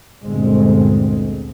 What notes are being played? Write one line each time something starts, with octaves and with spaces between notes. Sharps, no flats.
G1 D2 A#2 D3 G#3 C4